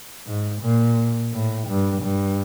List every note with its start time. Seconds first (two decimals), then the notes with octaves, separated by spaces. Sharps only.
0.27 G#2
0.61 A#2
1.33 A2
1.68 G2
2.02 G2